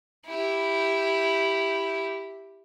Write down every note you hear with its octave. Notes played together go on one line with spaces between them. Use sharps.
E4 G4